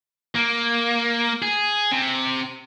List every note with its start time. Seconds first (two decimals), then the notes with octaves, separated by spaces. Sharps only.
0.35 A#3
1.42 G#4
1.92 C3